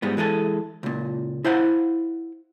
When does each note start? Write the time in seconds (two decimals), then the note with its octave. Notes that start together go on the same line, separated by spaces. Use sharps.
0.02 G#2 G3 G#3 B3
0.17 E3 G#3 G#4 A4
0.83 C#2 A#2
1.44 E4 C5 F5 F#5